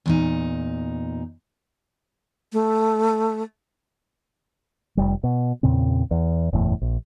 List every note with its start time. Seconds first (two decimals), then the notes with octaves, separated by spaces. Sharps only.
0.06 E2 A#2 D#4
2.53 A3
4.97 F1 G3
5.24 B2
5.63 E2 A#2 C#3 C4
6.11 E2
6.53 F#1 E2 A2
6.81 A#1